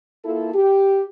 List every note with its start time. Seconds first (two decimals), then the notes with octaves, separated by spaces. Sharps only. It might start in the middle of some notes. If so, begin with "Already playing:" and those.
0.25 A#3 E4 F4 A4
0.54 G4